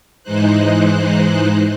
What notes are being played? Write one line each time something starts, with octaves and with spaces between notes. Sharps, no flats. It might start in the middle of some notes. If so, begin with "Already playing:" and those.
G#2 E3 G#3 D#4 C5 F#6